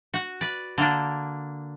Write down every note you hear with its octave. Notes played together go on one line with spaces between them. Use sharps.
F#4 F#5
B4 D5
D3 A#3 D4